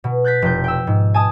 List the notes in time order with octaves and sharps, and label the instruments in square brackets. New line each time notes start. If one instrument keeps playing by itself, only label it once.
[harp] B2
F#6 G6 A6 B6
F1 G6
G5 E6
G#2
G#5 A5 D#6